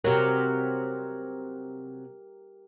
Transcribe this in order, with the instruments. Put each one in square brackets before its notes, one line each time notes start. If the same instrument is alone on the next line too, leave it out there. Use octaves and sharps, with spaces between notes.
[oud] C3 F#3 [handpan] G4 A#4